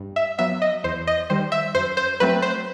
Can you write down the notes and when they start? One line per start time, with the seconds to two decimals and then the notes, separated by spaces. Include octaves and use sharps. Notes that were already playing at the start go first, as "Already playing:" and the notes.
Already playing: G2
0.16 E5
0.39 F#3 B3 E5
0.62 D#5
0.84 E2 C5
1.07 D#5
1.30 D#3 G3 C5
1.52 E5
1.74 F#2 C5
1.97 C5
2.20 F#3 A3 C4 B4
2.42 C5